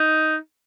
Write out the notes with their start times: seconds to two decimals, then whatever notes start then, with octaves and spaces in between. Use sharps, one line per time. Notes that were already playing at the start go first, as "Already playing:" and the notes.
Already playing: D#4